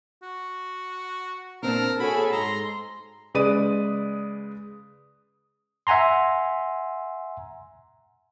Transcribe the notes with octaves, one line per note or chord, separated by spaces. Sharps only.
F#4
A#2 C4 D4 A#4 A5
F#4 G#4 A4 C#5 G#5 B5
G#2 A#5 C6
C#3 G#3 B4 D5 D#6 D#7
E5 F#5 G#5 A#5 C6